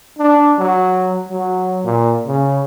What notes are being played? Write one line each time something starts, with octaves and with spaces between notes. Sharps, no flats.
D4
F#3
F#3
A#2
C#3